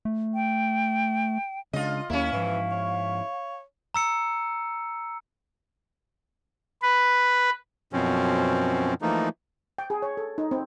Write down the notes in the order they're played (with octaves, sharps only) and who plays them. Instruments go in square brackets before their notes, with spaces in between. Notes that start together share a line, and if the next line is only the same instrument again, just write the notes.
[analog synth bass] A3
[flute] G5
[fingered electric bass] C#3 G#3 D4 [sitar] F4 D#5
[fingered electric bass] D#2 A#3 [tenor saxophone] F#3 [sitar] C#4 E4 [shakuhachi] F5
[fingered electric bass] G#2 F3 [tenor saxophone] E3
[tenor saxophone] C#5
[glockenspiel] A#5 E6 C#7
[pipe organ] B4
[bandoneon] F#2 B2 F3 C4 C#4
E3 F3 A3 A#3 D#4
[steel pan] G5
G#4
C#5
A4
D#4
C4